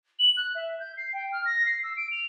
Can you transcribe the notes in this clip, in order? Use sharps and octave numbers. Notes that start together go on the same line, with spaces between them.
F#7
F#6
E5
G6
C7
G5
F6
A#6
C7
E6
D7
F7